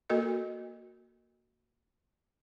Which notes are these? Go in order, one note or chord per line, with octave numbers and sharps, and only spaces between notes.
A#3 F#4 A4 A#4 D#5